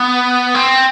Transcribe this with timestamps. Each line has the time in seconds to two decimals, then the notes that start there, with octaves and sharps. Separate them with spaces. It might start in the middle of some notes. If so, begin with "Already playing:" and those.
Already playing: B3
0.55 C4